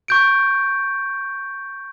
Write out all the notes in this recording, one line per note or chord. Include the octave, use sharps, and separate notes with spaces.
C#6 G6 D7